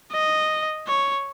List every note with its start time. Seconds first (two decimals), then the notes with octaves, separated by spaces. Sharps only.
0.12 D#5
0.87 C#5